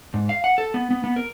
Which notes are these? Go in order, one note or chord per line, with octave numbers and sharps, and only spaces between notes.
G#2
F5
F#5
A4
B3
B3
B3
A#4